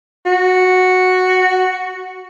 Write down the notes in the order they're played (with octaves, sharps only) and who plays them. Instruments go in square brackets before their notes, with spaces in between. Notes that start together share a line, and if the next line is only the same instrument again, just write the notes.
[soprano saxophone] F#4